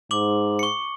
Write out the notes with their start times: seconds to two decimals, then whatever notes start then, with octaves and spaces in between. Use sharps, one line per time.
0.11 G#2 D6 F#7
0.59 C#6 C#7